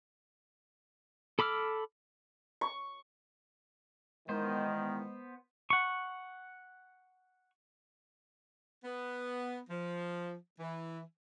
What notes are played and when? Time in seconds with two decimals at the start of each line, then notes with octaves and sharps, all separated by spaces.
1.39 A4 B5 D6 E6 F6
2.61 C#6
4.29 E2 D#3 G#3 B3 C5
5.70 F#5 C#6
8.84 B3
9.69 F3
10.60 E3